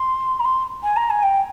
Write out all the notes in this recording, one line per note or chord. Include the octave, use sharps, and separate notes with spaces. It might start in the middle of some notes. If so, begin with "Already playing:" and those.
Already playing: C6
A#5
C6
G#5
A#5
G#5
G5